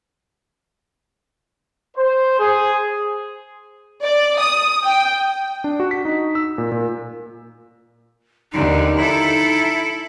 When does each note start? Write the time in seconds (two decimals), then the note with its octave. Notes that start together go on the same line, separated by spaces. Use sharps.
1.96 C5
2.39 G#4
4.02 D5
4.40 D#6
4.84 G5
5.64 D4
5.80 F#4
5.91 B6
6.05 D#4
6.35 E6
6.58 A#2
6.72 A#2
8.52 D#2 D3 D#4
8.97 E4 A4